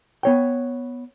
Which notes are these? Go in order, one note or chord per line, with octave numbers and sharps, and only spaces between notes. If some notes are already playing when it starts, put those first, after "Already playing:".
B3 C#5 G5